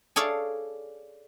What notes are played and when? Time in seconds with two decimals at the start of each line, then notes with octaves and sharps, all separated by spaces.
0.16 G#4 A4 C#5 D5 F5